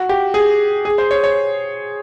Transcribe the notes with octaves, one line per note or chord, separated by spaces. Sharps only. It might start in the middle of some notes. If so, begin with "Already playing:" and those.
Already playing: F#4
G4
G#4
G#4
C5
C#5
C#5